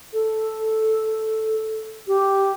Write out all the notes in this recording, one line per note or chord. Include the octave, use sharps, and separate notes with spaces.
A4
G4